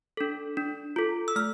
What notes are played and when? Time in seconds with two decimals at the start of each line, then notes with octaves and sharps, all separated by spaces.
0.17 D4 A4
0.57 D4
0.96 F4 A4
1.28 E6
1.36 A3 F6